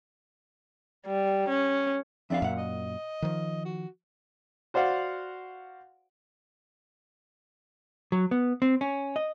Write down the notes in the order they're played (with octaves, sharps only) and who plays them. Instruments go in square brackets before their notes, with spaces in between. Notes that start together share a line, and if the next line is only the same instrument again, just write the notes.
[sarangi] G3
C#4
[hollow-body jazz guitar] F2 D4 F5 [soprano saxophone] E5
[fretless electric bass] F#2 A#2 [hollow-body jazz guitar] F5 F#5
[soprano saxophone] D#5
[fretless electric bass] D#3 F3
[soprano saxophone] F#4
[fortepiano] F#4 C5 D5 F5 F#5
[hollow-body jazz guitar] F#3
B3
C4
C#4
D#5